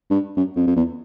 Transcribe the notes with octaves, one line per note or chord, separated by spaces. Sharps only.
G2
F#2
F2
F2
E2